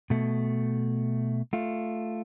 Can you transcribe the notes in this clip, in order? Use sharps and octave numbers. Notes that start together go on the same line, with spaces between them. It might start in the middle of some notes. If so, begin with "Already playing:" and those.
B2 A3
A3 F4